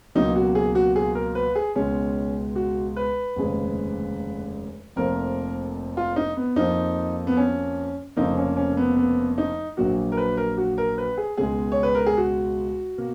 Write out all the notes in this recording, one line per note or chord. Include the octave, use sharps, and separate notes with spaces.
C#2 B2 F#3 A#3 D#4
F#4
G#4
F#4
G#4
A#4
B4
G#4
C#2 B2 G#3 C#4
F#4
B4
F1 D#2 C#3 G#3
F1 F2 F3 A#3 A#4
F4
D#4
B3
F2 F3 A#3 D#4
B3
C#4
F1 F2 C#3 F3 A#3 D#4
C#4
C#4
B3
B3
D#4
A#1 A#2 F#3 A#3 F#4
A#4
B4
A#4
F#4
A#4
B4
G#4
C#2 B2 G#3 G#4
C#5
B4
A#4
G#4
F#4
B2 A#3